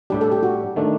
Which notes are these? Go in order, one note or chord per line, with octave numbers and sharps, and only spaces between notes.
A2 G3 D4 G4
A4
G4
F#4
D#3 A3 D4